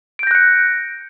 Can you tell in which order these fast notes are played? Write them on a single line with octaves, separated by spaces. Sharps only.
D7 G6 A#6 F#6 C#7